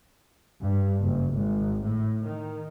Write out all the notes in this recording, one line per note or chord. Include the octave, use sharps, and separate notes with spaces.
G2
F#1
G#1
A2
D#3